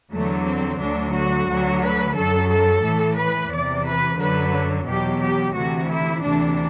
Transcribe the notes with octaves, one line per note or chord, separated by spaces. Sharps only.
E2 D3 F#3 A3
C4
D2 D3 F#3 D4
F#4
D2 D3 F#3
B4
F#2 F#3 A4
A4
A2 E3
B4
E2 C3 E3 D5
B4
F#2 D3 F#3 B4
E2 B2 F#3 G4
G4
D2 C3 E3 F#4
E4
D2 C3 E3 D4